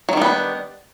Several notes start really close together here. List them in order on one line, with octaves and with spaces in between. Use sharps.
F#3 D#3 G3 B3 D4